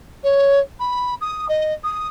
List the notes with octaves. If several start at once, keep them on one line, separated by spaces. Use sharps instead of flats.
C#5
B5
D#6
D#5
D#6